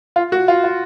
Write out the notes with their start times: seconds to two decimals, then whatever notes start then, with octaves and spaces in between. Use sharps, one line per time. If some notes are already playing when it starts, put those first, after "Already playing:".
0.16 F4
0.32 F#4
0.48 F4
0.64 F4